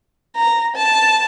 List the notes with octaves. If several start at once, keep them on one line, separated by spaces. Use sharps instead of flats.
A#5
A5